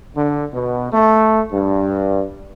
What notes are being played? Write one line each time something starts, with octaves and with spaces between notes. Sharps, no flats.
D3
B2
A3
G2